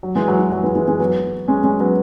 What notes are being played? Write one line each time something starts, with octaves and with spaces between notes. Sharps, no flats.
F#3
E3 G#3
F#3
E3
F#3
E3 G#3
E3 G#3
E3 G#3
F#3 B3
G#3 C#4
G#3 C#4
F#3 B3